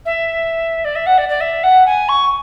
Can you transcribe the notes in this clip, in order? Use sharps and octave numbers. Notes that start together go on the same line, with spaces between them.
E5
D5
E5
F#5
D5
D5
E5
F#5
G#5
C#6